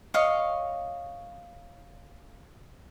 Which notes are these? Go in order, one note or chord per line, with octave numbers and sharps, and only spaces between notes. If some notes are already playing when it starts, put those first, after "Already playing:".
C#5 D#5 F5 C#6